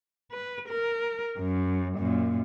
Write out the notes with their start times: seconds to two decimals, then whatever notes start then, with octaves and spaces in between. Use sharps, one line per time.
0.32 B4
0.69 A#4
1.38 F#2
1.98 F#2 A#2